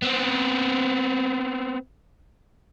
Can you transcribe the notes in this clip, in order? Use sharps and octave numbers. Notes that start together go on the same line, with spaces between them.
B3 C4